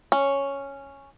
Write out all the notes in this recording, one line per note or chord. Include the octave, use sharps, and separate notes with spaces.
C#4